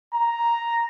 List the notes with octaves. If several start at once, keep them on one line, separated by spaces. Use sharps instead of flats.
A#5